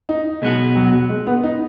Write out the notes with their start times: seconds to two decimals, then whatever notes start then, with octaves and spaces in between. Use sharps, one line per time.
0.09 D#4
0.42 B1 B2 G#3 B3 F#4
0.76 F#3
1.10 G#3
1.27 B3
1.44 D#4